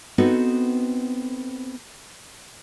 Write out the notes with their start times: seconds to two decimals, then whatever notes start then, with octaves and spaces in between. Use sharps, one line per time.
0.18 B3 C4 D#4 F#4 A4 B4